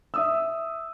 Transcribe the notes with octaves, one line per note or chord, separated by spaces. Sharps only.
E5 D#6 E6